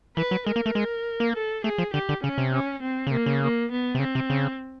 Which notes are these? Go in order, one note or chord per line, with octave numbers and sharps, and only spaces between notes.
E3 B4
F#3
G#3 A#4
A#3
A3
G#3
A#3
A4
A3 G#4
F3
D3 G4
D3
C#3 C#4
C3
C#4
C4
C#3
C3 A#3
C#3
A#3
B3
C3
C#3 C4
C3
C#3